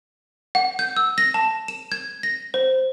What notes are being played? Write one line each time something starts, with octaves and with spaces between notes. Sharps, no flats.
F#5
G6
E6
A#6
A5
E7
G#6
A#6
C5